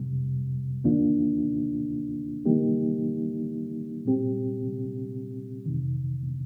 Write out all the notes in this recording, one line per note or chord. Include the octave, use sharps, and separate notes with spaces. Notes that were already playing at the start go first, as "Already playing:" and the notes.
Already playing: F2 C3 G3
D#2 D#3 A#3 D4 F4
D#3 G3 A#3 D#4 G4
A#2 G3 C4 G4
F2 C3 D#3